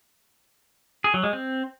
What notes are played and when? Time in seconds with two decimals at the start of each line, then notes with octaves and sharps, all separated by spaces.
1.04 G#4
1.14 F#3
1.23 G#3
1.33 C4